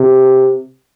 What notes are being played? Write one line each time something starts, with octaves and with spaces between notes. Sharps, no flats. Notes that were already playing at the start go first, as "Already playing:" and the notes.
Already playing: C3